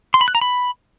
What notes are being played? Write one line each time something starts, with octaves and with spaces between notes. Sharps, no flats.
C6
B5
F#6
A#5
B5